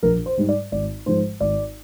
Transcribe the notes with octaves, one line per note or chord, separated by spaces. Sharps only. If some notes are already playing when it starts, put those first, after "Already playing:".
A#1 A#4
C5
G#2 G3
D5
G#1 D5
G#2 F3 G#3 C5
G#1 D5